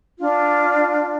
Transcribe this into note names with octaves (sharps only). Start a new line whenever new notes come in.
D4 F4